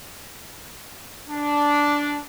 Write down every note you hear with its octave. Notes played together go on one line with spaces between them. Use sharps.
D4